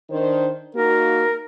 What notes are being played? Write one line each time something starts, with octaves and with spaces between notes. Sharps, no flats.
D#3 D4 C5
A#3 D#4 F#4 A#4